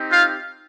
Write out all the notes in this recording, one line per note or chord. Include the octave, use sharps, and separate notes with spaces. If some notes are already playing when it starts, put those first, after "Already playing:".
Already playing: C4 D#4 G4
F4 F5